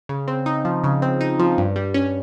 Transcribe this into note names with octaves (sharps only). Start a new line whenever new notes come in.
C#3
C4
D#4
F3
C#3
C4
D#4
F3
G2
G3
C#4